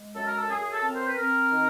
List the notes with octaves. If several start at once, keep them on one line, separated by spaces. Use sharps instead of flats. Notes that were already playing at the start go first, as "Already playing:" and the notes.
Already playing: G#3
F#2 A4
A#4
A4
F#2 G#4
G#4
A4
C4 A#4
C5
B4
C4 A#4
D#3